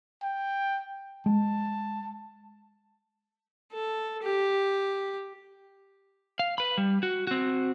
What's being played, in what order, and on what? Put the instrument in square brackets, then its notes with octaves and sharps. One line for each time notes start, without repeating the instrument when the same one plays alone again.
[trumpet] G5
[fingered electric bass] G#3 [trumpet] A5
[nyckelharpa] A4
G4
[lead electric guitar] F5
B4 B5
G3
F#4
C4 F#4